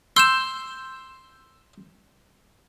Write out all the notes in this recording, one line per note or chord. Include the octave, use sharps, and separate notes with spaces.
C6 E6 G6 E7